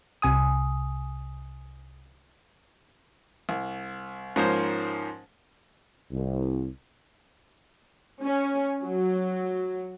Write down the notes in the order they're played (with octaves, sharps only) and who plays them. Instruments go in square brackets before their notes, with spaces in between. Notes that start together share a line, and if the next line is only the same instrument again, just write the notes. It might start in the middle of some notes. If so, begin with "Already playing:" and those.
[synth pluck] C2 C3 G#5 D#6
[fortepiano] C2
G#2 F3 A#3 C#4 C5
[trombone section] C2
[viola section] C#4
F#3